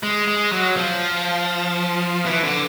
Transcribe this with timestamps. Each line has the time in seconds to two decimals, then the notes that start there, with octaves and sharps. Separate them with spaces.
0.03 G#3
0.27 G#3
0.52 F#3
0.77 F3
2.25 E3
2.43 D3